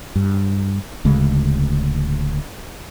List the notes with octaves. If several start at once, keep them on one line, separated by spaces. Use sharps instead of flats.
G2
D1 D2 C#3 G#3